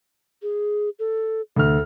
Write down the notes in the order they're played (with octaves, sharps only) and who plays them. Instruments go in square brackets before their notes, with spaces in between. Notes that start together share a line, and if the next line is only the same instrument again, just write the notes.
[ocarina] G#4
A4
[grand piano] D2 F6 [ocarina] A4